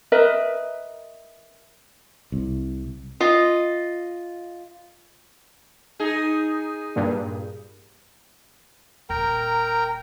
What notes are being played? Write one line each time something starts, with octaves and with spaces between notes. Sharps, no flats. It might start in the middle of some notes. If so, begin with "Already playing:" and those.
A#4 B4 D#5 E5
C2
F4 D#5
D#4 G#4
G2 A#2
D#1 A#4 G5 A#5